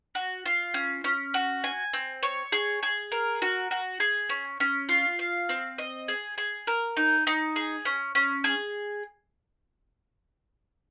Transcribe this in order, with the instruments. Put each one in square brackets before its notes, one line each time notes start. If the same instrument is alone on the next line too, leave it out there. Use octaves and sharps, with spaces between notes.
[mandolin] F#4
F4
C#4
C#4
F#4
G#5
C4
C#5
G#4
G#4
A#4
F#4
F#4
G#4
C#4
C#4
F4
F5
C4
D#5
G#4
G#4
A#4
D#4
D#4
G#4
C#4
C#4
G#4